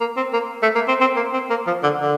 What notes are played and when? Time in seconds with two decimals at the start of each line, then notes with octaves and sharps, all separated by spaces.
0.01 A#3
0.17 C4
0.33 A#3
0.63 A3
0.75 A#3
0.88 C4
1.01 C4
1.16 A#3
1.34 C4
1.50 A#3
1.67 F3
1.83 D3
2.00 D3